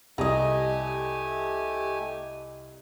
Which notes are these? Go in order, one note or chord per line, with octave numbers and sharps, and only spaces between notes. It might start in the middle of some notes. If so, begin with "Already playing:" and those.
C2 A3 G4 D#5 G#5 A#5